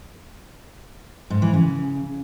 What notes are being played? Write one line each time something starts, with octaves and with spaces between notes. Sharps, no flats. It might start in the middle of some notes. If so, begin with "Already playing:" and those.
G#2
E3
C#3